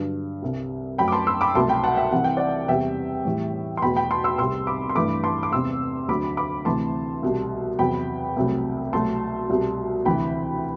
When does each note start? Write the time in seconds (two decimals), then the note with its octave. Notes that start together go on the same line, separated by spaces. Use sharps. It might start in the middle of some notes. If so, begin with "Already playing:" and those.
Already playing: G2 D3 F#3
0.42 C2 C3 G3
0.98 F#2 F#3 A3 G5 B5
1.08 D6
1.12 A5 C6
1.27 C6 E6
1.41 B5 D6
1.55 C2 B2 F#3 A3 A5 C6
1.69 G5 B5
1.84 F#5 A5
1.97 E5 G5
2.12 C2 C3 E3 F#5
2.24 G5
2.37 D5 F#5
2.68 E2 C3 G3 E5 G5
3.25 A2 E3 G3
3.77 C6
3.82 E2 B2 A3 G5 B5
3.96 G5 B5
4.11 A5 C6
4.24 C6 E6
4.38 C2 C3 G3 C6 E6
4.67 B5 D6
4.89 C6
4.95 G2 E3 A3 B5 D6
5.24 A5 C6
5.43 D6
5.52 E2 C3 G3 C6 E6
6.08 D2 D3 F#3 B5 D6
6.37 B5 D6
6.65 D2 C3 E3 A3 A5 C6
7.23 C2 B2 G3
7.79 E2 C3 F#3 G5 B5
8.36 C2 C3 F#3 A3
8.93 C2 B2 F#3 A3 A5 C6
9.49 C2 B2 G3
10.05 D2 C3 E3 G5 B5